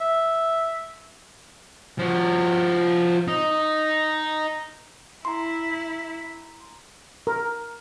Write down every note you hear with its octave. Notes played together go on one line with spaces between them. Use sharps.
E5
F3 F#4
D#4
E4 A#5 C6
A#4